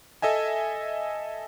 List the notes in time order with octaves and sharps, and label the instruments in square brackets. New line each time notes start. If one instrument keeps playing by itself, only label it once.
[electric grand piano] A4 D#5 E5 G#5